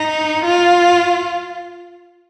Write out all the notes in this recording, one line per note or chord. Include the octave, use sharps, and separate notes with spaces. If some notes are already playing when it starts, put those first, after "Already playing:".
Already playing: D#4
F4